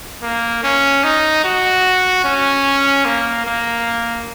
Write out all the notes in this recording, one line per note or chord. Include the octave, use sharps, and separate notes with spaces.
A#3
C#4
D#4
F#4
C#4
A#3
A#3